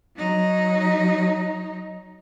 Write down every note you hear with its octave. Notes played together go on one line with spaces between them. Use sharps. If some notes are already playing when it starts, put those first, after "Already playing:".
F#3 D#4